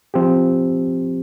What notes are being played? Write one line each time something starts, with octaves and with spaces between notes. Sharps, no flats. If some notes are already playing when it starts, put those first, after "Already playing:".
F3 C4 G4